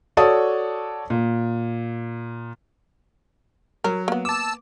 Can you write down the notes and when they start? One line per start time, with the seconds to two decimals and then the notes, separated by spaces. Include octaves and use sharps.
0.17 F#4 A4 C#5 D5 A5 D#6
1.10 A#2
3.84 F#3 A#4
4.08 A#3 B3
4.25 A5 D6 E6